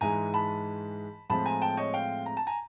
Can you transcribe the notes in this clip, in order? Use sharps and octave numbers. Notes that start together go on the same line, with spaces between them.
G#2 E3 G#3 G#5 A#5
A5 B5
A2 F3 G#3 C4 A5 B5
G#5 A#5
G5 A5
C#5 D#5
F5 G5
A#5
A5
G#5 A#5